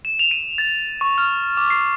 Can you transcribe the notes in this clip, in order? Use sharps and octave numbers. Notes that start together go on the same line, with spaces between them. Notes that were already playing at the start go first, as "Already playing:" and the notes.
E7
F7
D#7
A6
C#6
F6
D6
C7